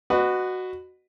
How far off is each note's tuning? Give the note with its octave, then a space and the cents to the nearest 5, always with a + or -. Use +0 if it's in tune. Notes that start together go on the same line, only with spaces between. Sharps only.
F#4 +0 B4 +15 D#5 -30